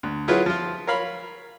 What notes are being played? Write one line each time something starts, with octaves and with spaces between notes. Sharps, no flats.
D2
F#3 E4 F4 G#4 B4 C#5
F3 F4
A#4 C#5 F5 B5